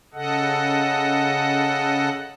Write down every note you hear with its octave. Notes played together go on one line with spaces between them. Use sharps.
C#3 A4 D#5 F#5